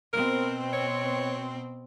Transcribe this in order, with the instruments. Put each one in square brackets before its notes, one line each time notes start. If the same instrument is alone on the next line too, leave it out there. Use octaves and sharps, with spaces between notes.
[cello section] B2 C4 [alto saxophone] A#4
[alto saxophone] C#5